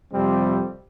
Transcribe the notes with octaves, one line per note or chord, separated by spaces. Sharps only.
F2 C3 G3 C4